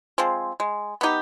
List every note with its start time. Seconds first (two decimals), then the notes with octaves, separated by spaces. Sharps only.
0.18 F3 G#3 C4
0.60 G#3
1.01 B3 D#4 G4